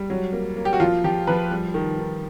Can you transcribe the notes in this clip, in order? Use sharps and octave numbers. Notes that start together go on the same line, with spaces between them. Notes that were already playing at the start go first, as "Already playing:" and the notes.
Already playing: G3
F#3
A#3
A#3
G4
F#4
F3 F4
F3 G4
F3 B4
G3
D#3
D#3